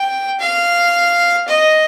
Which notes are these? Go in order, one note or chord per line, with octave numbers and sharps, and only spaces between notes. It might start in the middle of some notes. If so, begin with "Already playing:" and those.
Already playing: G5
F5
D#5